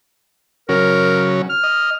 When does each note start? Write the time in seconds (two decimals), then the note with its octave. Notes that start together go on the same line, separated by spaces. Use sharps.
0.69 C#3 F#3 C#4 A#4
1.50 F6
1.64 D#5